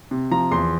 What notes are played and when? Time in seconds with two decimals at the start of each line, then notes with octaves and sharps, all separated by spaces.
0.11 C3
0.31 F3 A#5
0.51 E2 C6